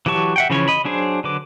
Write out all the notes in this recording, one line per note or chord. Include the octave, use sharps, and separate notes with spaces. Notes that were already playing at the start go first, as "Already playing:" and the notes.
E3 F#3 G4 A5 C#6
E5 F#5 G5
C#3 E3 F3 C#4 C#5
D#5 B5
F#3 D4 G#4 C5
D3 F#3 B4 D6